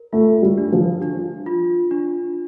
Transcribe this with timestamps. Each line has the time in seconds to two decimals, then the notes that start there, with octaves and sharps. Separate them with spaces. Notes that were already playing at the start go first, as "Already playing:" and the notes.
Already playing: A#4
0.13 A3 F4
0.42 G3
0.58 D4
0.72 F3
1.02 D4
1.46 F4
1.91 D4